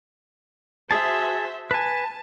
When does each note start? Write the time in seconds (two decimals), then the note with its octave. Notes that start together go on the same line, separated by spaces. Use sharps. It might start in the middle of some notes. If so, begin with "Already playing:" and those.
0.91 F#4 G#4 C5 E5 A5
1.71 B4 G#5 A5